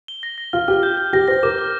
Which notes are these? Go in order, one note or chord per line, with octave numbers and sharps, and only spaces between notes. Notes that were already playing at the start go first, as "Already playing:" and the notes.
G7
A#6
A#6
F4 F6
G4 F6
G6
G6
G4 A#6
C5 A#6
A#4 D6
F6